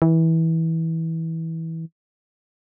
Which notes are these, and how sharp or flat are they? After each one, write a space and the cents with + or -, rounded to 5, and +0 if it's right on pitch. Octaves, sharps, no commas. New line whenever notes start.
E3 -20